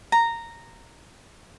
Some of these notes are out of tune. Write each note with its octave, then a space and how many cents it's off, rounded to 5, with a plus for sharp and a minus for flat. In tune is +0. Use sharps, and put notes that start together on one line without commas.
A#5 -10